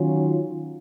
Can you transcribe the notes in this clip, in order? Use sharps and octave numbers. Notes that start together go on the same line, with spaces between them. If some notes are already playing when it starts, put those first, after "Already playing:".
Already playing: D#3 F#3 C#4 F4